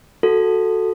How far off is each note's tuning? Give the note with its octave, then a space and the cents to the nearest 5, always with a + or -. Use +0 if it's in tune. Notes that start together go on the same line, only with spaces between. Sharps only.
F#4 +0 A4 +0